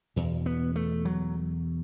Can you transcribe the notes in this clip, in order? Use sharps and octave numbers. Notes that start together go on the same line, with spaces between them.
E2 B2
B3
A3
F#3